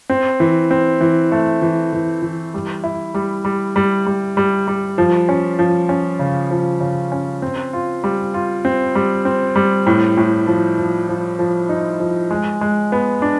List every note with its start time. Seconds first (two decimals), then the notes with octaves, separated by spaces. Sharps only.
0.10 C4
0.40 E3
0.71 C4
1.01 E3
1.32 A3
1.62 E3
1.93 E3
2.22 E3
2.54 G3
2.84 E4
3.14 G3
3.45 G3
3.76 G3
4.06 G3
4.37 G3
4.68 G3
4.98 F3
5.29 C#4
5.59 F3
5.89 C#4
6.19 C#3
6.51 F3
6.81 C#3
7.12 C#4
7.42 C4
7.73 F4
8.04 G3
8.34 F4
8.65 C4
8.95 G3
9.25 C4
9.56 G3
9.86 A2
10.17 A2
10.47 F3
10.78 F3
11.09 F3
11.39 F3
11.69 D#4
12.00 F3
12.31 G#3
12.61 G#3
12.92 B3
13.22 D4